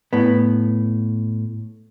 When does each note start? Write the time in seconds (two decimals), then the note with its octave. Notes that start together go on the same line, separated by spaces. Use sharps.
0.13 A2 B3